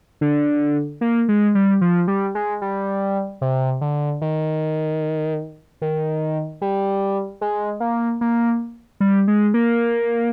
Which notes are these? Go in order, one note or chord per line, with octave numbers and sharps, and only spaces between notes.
D3
A#3
G#3
G3
F3
G3
G#3
G3
C3
D3
D#3
D#3
G3
G#3
A#3
A#3
G3
G#3
A#3